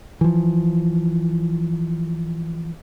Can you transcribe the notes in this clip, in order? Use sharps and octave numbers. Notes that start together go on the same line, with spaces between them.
E3 F3